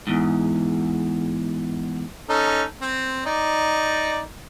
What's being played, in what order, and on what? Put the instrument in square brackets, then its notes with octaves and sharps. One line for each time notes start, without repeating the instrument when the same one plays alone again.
[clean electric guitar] E2 G#2
[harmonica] C#4 D#4 A4
C4
D#4 D5